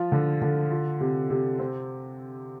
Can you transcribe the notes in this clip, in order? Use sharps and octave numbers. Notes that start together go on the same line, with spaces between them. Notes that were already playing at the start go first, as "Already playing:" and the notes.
Already playing: F3 F4
D3
D3
F4
C3
C3
C4